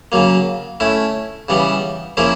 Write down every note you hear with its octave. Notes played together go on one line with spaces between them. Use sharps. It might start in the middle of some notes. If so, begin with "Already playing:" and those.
C#3 F#3 A#3
A3 C#4 E4
C#3 E3 G3 B3
F3 A#3 C#4 E4 G#4